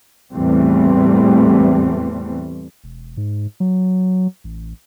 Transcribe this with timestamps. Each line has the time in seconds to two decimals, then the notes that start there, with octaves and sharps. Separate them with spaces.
0.33 E2 A2 E3 G3 A3 C4
2.84 E1
3.17 G#2
3.60 F#3
4.44 A1